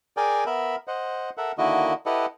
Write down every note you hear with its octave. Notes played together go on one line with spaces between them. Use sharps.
G#4 A#4 D5 G5 G#5
B3 A#4 E5 B5
C5 D#5 F#5
A4 A#4 E5 F#5
D3 D#3 A#3 E4 F#4 D#5
E4 G4 A4 B4 D#5 F#5